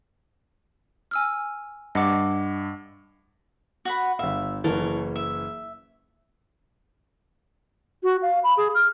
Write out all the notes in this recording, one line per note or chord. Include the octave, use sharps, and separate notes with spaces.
G#5 E6 F6
G2 D#5 F#5 D6
F#4 F#5 B5
G1 E5 F5
F#1 E3 A4 A#4 C#5
E5
F#4
F5
B5
G#4
F6